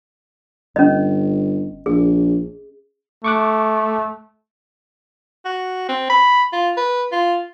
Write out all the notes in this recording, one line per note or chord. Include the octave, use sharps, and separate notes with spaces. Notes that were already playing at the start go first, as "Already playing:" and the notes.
G1 C#4 D#5
A#1 G#4
A3 C#6 D6 F#6
F#4
C4
B5
F4
B4
F4